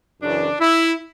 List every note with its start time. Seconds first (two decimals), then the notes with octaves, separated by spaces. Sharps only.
0.21 F#2 C#3 E3 D4
0.60 E4